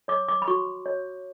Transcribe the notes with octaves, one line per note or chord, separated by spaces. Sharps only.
C#5 D6
D6
B5
F#4 C#6
C#5